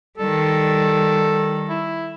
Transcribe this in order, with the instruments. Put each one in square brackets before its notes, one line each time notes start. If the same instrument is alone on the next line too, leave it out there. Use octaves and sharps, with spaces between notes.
[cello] D#3 G3 [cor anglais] A4
[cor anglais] E4